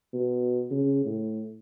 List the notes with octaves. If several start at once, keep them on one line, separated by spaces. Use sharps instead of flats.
B2
C#3
A2